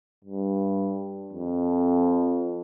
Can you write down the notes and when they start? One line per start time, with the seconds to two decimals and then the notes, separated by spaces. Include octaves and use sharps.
0.24 G2
1.33 F2